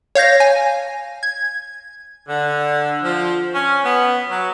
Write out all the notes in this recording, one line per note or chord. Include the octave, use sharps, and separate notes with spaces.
C#5 F5 G6 A#6
G#5
G#6
D3
F3
C#4
B3
F#3